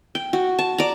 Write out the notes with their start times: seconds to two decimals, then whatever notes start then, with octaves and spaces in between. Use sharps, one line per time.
0.15 G5
0.33 F#4
0.59 A5
0.78 D5 A#5